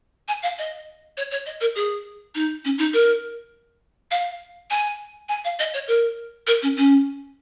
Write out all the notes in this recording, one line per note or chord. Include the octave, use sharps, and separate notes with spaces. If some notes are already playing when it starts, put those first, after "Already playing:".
G#5
F5
D#5
C#5
C#5
D#5
A#4
G#4
D#4
C#4
D#4
A#4
F5
G#5
G#5
F5
D#5
C#5
A#4
A#4
C#4
C#4